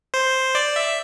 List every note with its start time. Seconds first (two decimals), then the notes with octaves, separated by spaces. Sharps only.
0.14 C5
0.55 D5
0.76 E5